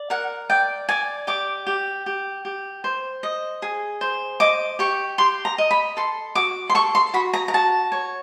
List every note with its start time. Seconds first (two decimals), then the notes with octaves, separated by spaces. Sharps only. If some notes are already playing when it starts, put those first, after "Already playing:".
Already playing: D5
0.10 A#4 F#5
0.49 D5 G5
0.89 D5 G#5
1.27 G4 D6
1.67 G4
2.06 G4
2.45 G4
2.84 C5
3.23 D#5
3.62 G#4
4.01 C5
4.40 D#5 D6
4.79 G4 C#6
5.18 G4 C6
5.45 A#5
5.58 D#5
5.71 B5
5.97 A4 C6
6.35 F#4 D6
6.69 C6
6.75 A4 C#6
6.95 C6
7.14 F#4 B5
7.33 A#5
7.48 A#5
7.53 F#4 A5
7.92 C#5